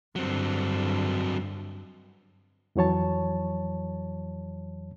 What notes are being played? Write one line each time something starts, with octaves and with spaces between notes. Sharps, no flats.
G2 D3 F#3 C4
F2 E3 F#3 C#5 A5